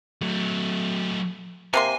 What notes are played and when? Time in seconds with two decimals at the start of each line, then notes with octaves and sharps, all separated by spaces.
0.21 F#3 A3
1.74 C3 A#3 G#5 C6